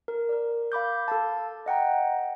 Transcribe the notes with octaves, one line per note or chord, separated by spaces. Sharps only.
A#4
A#4 D5
F5 B5 D6 G6
A4 F5 A5
D#5 F#5 G5 A#5